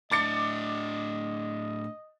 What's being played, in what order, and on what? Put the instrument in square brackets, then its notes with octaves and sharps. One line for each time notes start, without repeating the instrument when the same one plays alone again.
[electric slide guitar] A2 D4 [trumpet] D#5 [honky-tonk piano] D6 A6 C#7